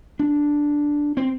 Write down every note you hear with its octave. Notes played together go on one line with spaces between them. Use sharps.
D4
C4